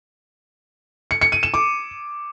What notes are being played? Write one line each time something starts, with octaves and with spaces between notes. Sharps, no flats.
C#7
C#7
D#7
E7
D6